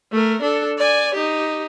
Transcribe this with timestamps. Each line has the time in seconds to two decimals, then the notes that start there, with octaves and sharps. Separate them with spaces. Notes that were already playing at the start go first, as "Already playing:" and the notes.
0.12 A3 A#4
0.42 D4 A4
0.78 D5 G#5
1.15 D#4 G4